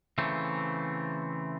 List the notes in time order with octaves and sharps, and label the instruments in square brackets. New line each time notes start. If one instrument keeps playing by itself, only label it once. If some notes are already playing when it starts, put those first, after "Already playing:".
[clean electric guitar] C#3 E3 A3 C4